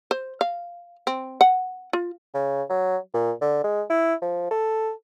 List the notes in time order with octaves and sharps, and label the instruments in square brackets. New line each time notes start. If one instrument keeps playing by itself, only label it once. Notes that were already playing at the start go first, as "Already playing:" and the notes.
[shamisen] C5
F5
C4
F#5
F4
[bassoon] C#3
F#3
A#2
D3
G#3
E4
F3
A4